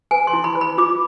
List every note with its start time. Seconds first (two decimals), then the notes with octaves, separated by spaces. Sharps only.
0.11 B4 G#5
0.27 C6
0.33 E4
0.44 B5
0.55 B4
0.61 B5
0.78 F4 D6